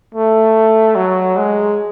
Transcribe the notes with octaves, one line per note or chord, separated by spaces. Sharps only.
A3
F#3
G#3